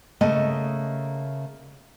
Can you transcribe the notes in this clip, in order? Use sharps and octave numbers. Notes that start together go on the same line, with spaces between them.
C#3 A3 A#3 D#5 A5